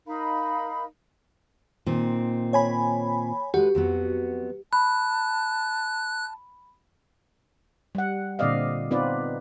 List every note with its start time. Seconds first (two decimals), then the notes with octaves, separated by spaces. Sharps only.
0.07 D#4 A#4 F5 B5
1.86 A#2 D#3 C4
2.53 C#5 G#5 B5
3.54 G#3 F#4 G4 A4 B4
3.75 F2 F#3 B3
4.73 A5 B5 F#6
7.95 G3 F#5
8.39 A#2 D3 C4 D5 D#5 F5
8.91 B3 C4 D#4 F4 B4 D5